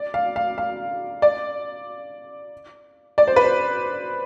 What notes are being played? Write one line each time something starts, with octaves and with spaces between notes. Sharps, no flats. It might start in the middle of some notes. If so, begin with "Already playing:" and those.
Already playing: D5
F5
F5
F5
D5
D5
C5
B4
C5